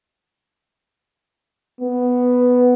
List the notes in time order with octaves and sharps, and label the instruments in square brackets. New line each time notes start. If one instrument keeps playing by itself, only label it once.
[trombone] B3